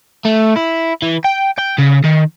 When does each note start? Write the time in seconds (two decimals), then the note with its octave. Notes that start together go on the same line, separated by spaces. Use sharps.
0.25 A3
0.56 E4
1.02 E3
1.25 G5
1.59 G5
1.79 C#3
2.04 D#3